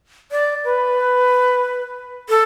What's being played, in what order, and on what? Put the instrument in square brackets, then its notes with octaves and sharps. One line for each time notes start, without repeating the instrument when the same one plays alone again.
[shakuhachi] D5
B4
A4